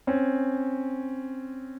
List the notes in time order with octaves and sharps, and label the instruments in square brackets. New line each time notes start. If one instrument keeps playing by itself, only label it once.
[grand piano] C4 C#4